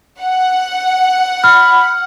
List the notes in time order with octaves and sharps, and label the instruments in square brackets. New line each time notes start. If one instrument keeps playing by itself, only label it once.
[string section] F#5
[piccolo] B5 [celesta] F6